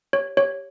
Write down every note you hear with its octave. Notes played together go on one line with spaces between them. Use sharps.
G4 C#5
G4 C#5